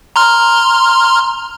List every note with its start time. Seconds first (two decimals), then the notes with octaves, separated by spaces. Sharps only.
0.16 A#5 C6 F6